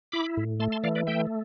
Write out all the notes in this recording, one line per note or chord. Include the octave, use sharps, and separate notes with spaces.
E4 B5 D6
A2
A3 A5 C6
A5 C6
E3 D5 F5
B4 D5
A3 E5 G5